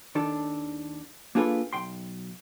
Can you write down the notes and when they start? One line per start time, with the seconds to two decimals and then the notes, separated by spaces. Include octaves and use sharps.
0.15 D#2 D#3 D4 A4
1.35 A#3 D4 F4 G#4 A4 B4
1.73 B1 G5 C6